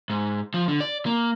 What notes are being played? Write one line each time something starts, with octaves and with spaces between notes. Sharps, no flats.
G#2
F3
D3
D5
A#3